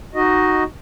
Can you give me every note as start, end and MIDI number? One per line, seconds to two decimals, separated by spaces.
0.14 0.64 63
0.14 0.64 66
0.14 0.64 75